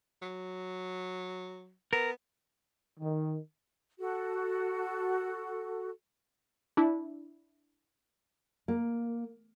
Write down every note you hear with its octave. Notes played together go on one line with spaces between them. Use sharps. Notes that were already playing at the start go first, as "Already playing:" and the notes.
F#3
B3 A#4
D#3
F#4 A4
D4 E4
A#3